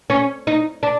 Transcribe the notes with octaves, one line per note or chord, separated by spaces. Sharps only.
C#4
D#4
D4